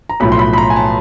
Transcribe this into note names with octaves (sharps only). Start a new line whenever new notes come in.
A#5
B1 A2 F3 B5
C6
B5
B5
A#5
G#5
A5